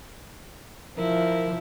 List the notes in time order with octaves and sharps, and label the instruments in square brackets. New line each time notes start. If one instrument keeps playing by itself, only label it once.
[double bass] F3 [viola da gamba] E4 [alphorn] A#4